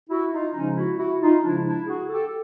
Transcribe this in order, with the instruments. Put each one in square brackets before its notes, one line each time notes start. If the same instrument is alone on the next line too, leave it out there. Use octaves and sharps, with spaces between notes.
[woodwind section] E4 F#4
D#4 F4
C#3 F3 G#3 C#4 D#4
E4 F#4
E4 F#4
D#4 F4
C#3 F3 G#3 D4 E4
D4 E4
F#4 G#4
G4 A4